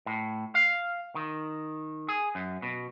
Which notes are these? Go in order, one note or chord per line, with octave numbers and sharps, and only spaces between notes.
A2
F5
D#3
G#4
F#2
B2